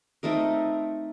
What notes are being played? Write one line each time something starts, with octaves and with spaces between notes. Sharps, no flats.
A3 C4 D#4 A#4